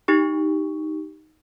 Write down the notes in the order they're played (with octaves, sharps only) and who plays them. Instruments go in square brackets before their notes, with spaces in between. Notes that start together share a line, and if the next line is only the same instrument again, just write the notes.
[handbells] D#4 G4 C#6